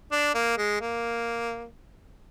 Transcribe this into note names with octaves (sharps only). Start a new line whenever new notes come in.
D4
A#3
G#3
A#3